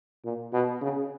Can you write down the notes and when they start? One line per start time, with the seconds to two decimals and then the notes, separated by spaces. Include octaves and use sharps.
0.24 A#2
0.53 B2
0.81 C#3